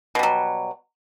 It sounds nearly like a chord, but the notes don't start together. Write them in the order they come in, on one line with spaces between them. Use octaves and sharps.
B2 G3 F#3